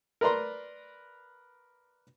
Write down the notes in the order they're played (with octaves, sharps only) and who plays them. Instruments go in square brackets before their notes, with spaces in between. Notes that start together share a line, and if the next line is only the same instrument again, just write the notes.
[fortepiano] A#4 B4 D5 A#5 C6